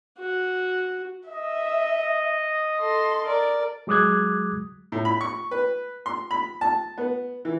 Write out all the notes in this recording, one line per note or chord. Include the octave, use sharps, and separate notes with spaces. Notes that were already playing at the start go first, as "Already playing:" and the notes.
F#4
D#5 E5
A4 C6
A#4 D5
F#3 G#3 D6 D#6 F#6 G#6
A2
B5
C#6
B4
C6
B5
A5
B3
E3